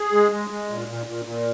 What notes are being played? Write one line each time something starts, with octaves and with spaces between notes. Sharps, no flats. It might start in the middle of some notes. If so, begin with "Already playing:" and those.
Already playing: G#4
G#3
G#3
G#3
A#2
A#2
A#2
A#2